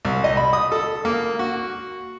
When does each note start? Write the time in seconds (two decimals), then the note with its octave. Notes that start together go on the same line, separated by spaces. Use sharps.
0.05 C2
0.24 D#5
0.37 B5
0.53 D#6
0.72 A4
1.05 A#3
1.39 F#4